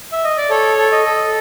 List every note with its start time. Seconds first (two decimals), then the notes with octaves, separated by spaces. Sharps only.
0.12 E5
0.24 D#5
0.38 D5
0.50 A4 C#5
0.78 A4
0.92 D#5
1.06 A4